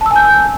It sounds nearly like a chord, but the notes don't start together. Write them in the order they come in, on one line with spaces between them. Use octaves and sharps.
A5 E6 G#5 G6